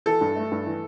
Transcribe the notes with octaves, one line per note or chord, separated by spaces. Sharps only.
E3 A4
G2
A3
G2
E3